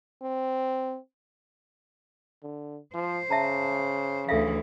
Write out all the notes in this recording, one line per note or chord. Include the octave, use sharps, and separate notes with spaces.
C4
D3
F3 C5
C#3 E5 A5 A#5
D2 E3 A4 E5 F5